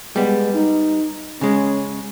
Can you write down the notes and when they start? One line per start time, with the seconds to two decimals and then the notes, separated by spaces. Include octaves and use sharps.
0.16 G3 G#3 B3
0.54 D#4
1.41 C#3 G#3 C#4